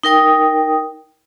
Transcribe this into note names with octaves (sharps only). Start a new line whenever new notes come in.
D#4 A#4 G5 D#6